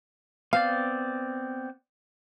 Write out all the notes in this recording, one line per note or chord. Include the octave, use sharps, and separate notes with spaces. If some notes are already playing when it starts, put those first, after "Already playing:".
B3 C4 D5 F5